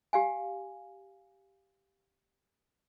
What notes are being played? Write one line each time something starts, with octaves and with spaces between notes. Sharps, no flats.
G4 F5 G#5